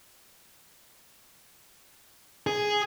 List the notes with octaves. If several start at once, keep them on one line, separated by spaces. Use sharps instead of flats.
G#4